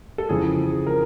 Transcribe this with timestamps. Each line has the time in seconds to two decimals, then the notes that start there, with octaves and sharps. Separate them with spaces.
0.18 A4
0.29 F2 C#3 E3 G#4
0.87 A#4